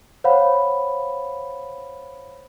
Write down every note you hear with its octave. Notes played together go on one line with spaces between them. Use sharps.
C5 C#5 F5 F#5 B5